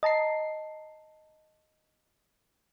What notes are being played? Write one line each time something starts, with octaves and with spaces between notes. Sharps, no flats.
D#5 A5 A#5 C7